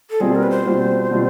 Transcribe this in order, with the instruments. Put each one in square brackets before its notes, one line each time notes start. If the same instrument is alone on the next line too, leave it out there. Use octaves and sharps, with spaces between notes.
[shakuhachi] A4
[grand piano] B2 G3 C4 F4 [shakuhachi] G#4
[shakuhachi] A#4
B4
C5
[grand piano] B2 G3 C4 F4
B2 G3 C4 F4